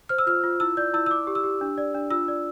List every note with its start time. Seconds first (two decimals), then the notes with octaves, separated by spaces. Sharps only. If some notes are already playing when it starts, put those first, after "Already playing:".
0.09 C5 F6
0.19 E6
0.27 F4 F6
0.44 F4
0.60 E4 E6
0.77 D5 G6
0.94 E4 E6
1.06 E6
1.10 D5 D6
1.27 G4
1.35 E6
1.44 G4
1.61 D4
1.78 D5
1.94 D4
2.10 F4 E6
2.28 D5